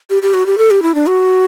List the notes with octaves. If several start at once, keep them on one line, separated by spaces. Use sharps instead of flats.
G4
G4
F#4
G4
A4
G4
E4
D4
F#4